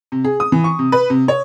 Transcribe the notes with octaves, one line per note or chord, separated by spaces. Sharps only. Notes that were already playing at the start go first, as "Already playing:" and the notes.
C3
G#4
D#6
E3
C#6
C3
B4
C3
C#5